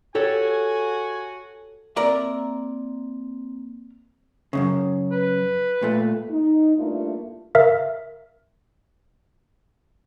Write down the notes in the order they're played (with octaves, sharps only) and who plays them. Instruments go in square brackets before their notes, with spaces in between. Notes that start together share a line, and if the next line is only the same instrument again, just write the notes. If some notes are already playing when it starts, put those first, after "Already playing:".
[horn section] F#4 G#5 [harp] G4 A4 C#5
[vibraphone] A#3 C4 [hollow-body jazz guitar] A#4 D5 E5
[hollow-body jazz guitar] F#2 A#2 C#3
[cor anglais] B4
[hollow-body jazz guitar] A#2 A3
[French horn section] D#4
G2 A3 A#3 D4 E4 F4
[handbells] A#4 E5 F5